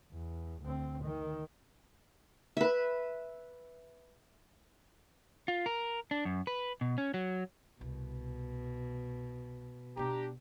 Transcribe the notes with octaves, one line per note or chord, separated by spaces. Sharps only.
E2
D2 C4
D#3
B4 E5
F4
A#4
D4
F#2
B4
B2
C#4
F#3
C2 B2
B2 B3 D4 G4 A#5